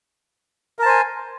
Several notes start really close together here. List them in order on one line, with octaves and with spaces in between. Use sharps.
A#4 A5 C5 G#5